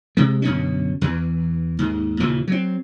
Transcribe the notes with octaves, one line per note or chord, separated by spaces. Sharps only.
C3 G#3
F#2 B2 D3 C#4
E2 E3
D#2 G#2
D#2 A#2 C#3 E3
F#3 C4